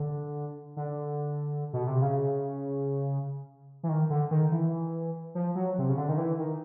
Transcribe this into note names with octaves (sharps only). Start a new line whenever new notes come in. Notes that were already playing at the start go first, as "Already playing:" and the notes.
Already playing: D3
D3
B2
C3
C#3
E3
D#3
D3
D#3
E3
F3
F#3
C3
C#3
D3
D#3
E3
D#3